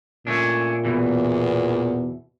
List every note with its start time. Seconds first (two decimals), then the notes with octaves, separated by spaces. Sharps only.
0.27 A#2 A3 C#4 D4
0.85 E2 B2 E3